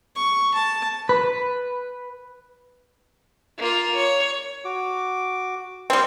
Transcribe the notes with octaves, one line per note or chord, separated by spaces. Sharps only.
C#6
A5
B4
A#3 F4
C#5
F#4 D6
G3 C4